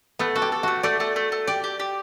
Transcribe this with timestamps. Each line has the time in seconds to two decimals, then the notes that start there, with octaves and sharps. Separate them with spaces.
0.19 A3 B3
0.35 F#4 A4
0.42 G4
0.52 A4
0.63 A3 F#4
0.83 A3 D5
1.00 A3
1.16 A3
1.32 A3
1.47 G4 D5
1.64 G4
1.80 G4